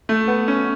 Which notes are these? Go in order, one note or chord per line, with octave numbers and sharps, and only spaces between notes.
A3
B3
C#4